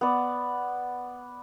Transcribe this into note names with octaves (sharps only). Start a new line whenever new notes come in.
B3 D5